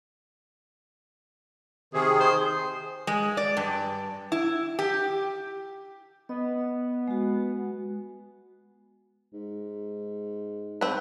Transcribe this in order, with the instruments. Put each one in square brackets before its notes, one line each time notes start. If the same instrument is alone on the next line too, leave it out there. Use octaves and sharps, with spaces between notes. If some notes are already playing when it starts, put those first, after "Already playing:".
[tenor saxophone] C3 [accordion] D#3 G#4
[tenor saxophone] C5
[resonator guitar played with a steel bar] G#3
D5
G2
E4
G4
[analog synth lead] B3 [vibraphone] D#5
[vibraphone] G#3 F#4
[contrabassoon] G#2
[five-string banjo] C4 B4